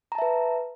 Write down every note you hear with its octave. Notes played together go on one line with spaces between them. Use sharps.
B4 E5 A5 A#5